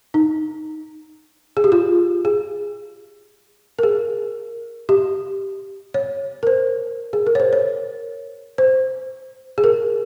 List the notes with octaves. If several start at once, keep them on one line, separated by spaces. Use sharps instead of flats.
D#4
G#4
G4
F4
G#4
A#4
G#4
G4
C#5
A#4
C5
G#4
A#4
C#5
C5
C#5
C5
G#4
A#4